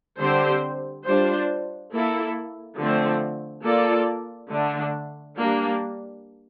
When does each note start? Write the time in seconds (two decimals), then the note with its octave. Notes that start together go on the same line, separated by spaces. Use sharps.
0.19 D3 G3 C4 G4 C5
1.06 G3 D4 F4 C5
1.91 A#3 E4 A4
2.78 D3 F3 A3 C4
3.64 A#3 F4 A4 D5
4.50 D3 A3 D4
5.37 G3 A#3 D4